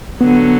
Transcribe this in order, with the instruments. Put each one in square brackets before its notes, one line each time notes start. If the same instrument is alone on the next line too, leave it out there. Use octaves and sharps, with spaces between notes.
[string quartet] D3 F#3 [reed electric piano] B3